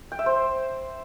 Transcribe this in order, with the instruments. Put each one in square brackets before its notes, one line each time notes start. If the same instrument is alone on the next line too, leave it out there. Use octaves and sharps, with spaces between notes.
[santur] G5
E5
C5